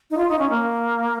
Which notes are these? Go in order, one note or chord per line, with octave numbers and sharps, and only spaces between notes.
D#4
F4
D#4
C#4
A#3